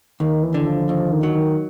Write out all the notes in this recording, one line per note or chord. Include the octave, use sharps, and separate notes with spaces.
D#2 D#3
E3
D3
F3
D#2 F3
D#3
F#3
D#3